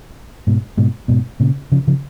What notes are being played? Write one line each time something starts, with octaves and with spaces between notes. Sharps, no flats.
G#2 B2
G#2 B2
G#2 B2
A#2 C#3
C#3 F3
C#3 F3